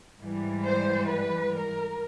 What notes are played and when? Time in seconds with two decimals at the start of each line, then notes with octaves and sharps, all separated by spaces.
0.20 G#2 E3 G3
0.65 C5
1.10 B4
1.55 A#4